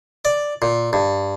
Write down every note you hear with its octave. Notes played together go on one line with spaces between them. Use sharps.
D5
A#2
G2